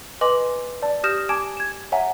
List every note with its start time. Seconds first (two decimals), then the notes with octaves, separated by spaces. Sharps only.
0.21 B4 D#5 G#5 C6 D6 F#7
0.82 D5 A5
1.04 G4 D#6 F6 G6 A#6 E7
1.29 G#5 A5 D6 G#6 D7 E7
1.57 G#6 E7
1.92 C#5 E5 F#5 G#5 A#5